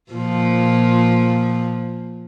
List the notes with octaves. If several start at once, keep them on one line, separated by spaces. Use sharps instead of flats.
A#2 F3